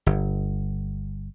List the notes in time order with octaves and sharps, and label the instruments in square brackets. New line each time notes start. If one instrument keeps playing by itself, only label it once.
[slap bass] G1